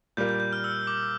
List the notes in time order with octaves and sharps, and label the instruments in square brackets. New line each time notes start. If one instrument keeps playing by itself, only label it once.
[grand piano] A#2 G3 A#3 [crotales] G6
[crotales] G6
G6
F6
E6
D6